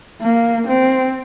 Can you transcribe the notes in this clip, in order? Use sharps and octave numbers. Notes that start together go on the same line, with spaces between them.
A#3
C4